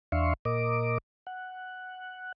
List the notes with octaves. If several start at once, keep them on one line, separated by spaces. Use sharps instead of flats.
E2 D4 E5 F5 C6 C#6
A#2 A#4 D#5 D6
F#5